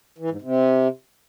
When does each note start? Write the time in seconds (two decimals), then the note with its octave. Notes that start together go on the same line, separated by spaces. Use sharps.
0.18 E3
0.30 G#2
0.42 C3